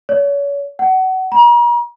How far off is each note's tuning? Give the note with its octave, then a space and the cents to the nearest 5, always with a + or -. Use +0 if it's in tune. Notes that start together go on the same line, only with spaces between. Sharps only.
C#5 +35
F#5 +25
A#5 +40